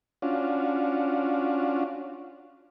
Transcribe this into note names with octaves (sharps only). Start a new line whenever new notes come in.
C#4 D4 F4 F#4